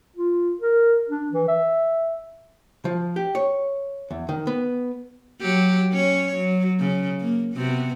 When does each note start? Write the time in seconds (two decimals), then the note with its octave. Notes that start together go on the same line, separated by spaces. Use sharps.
0.17 F4
0.61 A#4
1.09 D4
1.33 E3
1.48 E5
2.85 F3
3.16 G4
3.35 C#5
4.11 E2
4.29 D#3
4.47 B3
5.40 F#3 G4
5.92 C#4 C#5
6.36 F#3
6.80 C#3
7.20 A#3
7.54 C3 B3 F#4